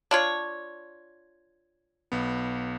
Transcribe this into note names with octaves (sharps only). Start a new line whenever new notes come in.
D4 F4 C#5
B1 B3